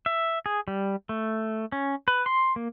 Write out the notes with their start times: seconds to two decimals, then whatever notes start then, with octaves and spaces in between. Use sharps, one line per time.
0.06 E5
0.46 G#4
0.68 G3
1.09 A3
1.72 C#4
2.08 B4
2.26 C6
2.56 A#3